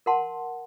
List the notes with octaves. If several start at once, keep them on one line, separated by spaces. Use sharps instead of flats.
A#4 F#5 A5 C6